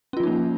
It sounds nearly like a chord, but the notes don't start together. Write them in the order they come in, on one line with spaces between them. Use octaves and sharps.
C#4 F4 F3 D#4 A#3